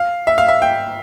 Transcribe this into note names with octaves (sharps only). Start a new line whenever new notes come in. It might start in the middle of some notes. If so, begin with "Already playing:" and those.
Already playing: F5
E5
F5
E5
G5